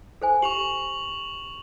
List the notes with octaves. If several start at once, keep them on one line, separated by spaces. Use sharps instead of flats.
A4 C5 G#5
G4 C#6 F7 F#7